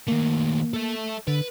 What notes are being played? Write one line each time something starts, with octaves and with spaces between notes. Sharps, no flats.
D#3 A3 A#3
A4 E5
D3 B4